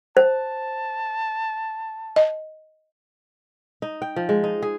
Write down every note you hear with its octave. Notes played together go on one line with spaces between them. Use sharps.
C5 A5
D#5
D#4
G5
F3
G#3
D#4
G#4